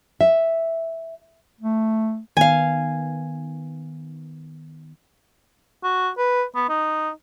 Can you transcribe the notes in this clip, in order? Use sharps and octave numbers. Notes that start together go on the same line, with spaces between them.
E5
A3
D#3 B3 F5 G#5
F#4
B4
B3
D#4